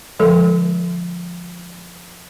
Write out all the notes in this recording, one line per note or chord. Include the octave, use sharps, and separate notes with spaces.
D3 F3 G#3 A4